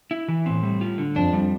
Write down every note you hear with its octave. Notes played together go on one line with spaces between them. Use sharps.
E4
E3
A2 C4
G3
F4
D3
F2 D4
G3